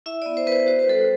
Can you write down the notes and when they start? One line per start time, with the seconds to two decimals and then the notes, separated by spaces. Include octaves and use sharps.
0.06 E4 E5
0.22 B3 D5
0.37 C5
0.46 B3 B4
0.52 C5
0.67 F#4 C5
0.79 B4
0.88 G3 A4